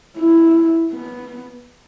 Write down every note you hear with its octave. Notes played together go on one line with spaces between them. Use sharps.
E4
B3